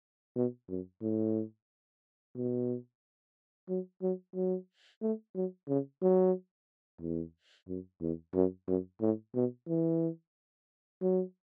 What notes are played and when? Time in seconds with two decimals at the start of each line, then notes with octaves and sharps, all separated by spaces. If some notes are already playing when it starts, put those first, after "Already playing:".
0.36 B2
0.69 F#2
1.02 A2
2.35 B2
3.69 F#3
4.02 F#3
4.35 F#3
5.02 A3
5.35 F#3
5.68 C#3
6.02 F#3
7.01 E2
7.68 F#2
8.01 E2
8.34 F#2
8.68 F#2
9.01 A2
9.35 B2
9.68 E3
11.01 F#3